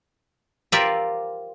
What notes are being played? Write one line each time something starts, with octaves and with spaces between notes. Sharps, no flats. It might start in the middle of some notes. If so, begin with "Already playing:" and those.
F4 G4 A#4 C5 D5 E5